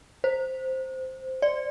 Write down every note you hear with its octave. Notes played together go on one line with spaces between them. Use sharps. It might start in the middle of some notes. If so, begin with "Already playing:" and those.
C5
D5